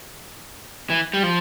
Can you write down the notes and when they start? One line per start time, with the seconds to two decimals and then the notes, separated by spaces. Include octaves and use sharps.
0.90 E3
1.14 G3
1.23 F3